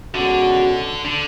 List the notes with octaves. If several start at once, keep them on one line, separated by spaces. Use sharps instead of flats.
B2 D3 G#3 C#4 F#4
D3